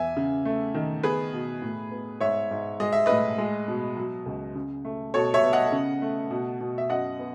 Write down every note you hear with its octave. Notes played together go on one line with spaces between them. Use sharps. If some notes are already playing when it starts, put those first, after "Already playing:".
Already playing: E2 E5 G#5
C#3
A3
D#3
B3 G#4 B4
B2
A2
B3
G#2 C#5 E5
G#2
G#3 D#5
E5
A2 B4 D#5
G#3
B2
F#3
C#2
C#3
A3
B2 A4 C#5
C#5 E5
B3
D#5 F#5
C#3
A3
B2
B2
E5
F#2 D#5 F#5
B3